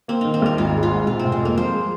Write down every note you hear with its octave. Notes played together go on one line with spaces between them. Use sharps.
A#3 C4
D#3 D#4
C4
D#2 A#4
G#1 F4
G#3
F4
G#2
C3 F4
C4
F1
G#3
F2 A#3
F3 C5
G#3